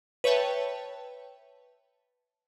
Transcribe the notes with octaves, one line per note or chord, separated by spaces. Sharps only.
B4 C#5 E5 G5 A5